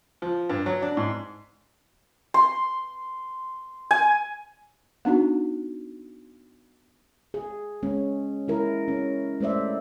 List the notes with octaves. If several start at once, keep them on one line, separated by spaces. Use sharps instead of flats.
F3
G2
F#3
D4
G#2
C6
G#5
B3 D4 D#4 F#4
G#4
G#3 C#4
G#3 E4 A#4
C#4
G#3 A3 C5 D5 E5